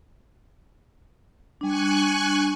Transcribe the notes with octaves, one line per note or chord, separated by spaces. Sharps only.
G3 D4 G#5 C#6 F#6